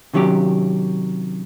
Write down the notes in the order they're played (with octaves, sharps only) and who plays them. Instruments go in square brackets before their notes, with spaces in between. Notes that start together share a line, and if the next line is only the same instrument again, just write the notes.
[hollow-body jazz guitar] C3 D#3 F#3 C#4 G4